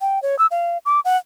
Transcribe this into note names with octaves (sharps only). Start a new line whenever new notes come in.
G5
C#5
E6
F5
D6
F#5